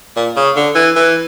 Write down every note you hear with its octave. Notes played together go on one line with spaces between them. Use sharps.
A#2
C#3
D3
E3
E3